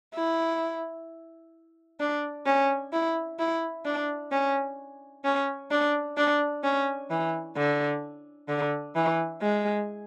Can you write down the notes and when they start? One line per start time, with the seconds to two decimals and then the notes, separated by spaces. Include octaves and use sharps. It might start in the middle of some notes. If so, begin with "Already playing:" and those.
0.14 E4
2.00 D4
2.46 C#4
2.93 E4
3.39 E4
3.85 D4
4.31 C#4
5.25 C#4
5.71 D4
6.17 D4
6.64 C#4
7.10 E3
7.56 D3
8.49 D3
8.95 E3
9.42 G#3